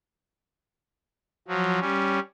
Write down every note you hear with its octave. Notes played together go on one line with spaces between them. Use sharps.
F3 F#3
G3 C#4